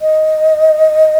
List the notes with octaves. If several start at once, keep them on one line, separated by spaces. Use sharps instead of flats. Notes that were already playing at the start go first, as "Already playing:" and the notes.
D#5